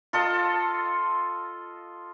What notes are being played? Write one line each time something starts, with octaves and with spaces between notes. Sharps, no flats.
F4 A4 D#5